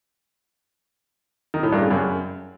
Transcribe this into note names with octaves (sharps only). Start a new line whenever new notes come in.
D#3
A2
G2
C#3
F#2